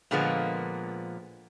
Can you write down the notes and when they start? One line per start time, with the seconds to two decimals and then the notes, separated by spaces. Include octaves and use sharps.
0.11 A#2 D3 F3 G#3 A#3 B3